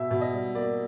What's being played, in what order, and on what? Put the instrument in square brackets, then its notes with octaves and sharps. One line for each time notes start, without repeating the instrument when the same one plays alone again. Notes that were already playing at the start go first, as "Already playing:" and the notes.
Already playing: [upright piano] B2 E5
B2
D#5
G3
A#3 D5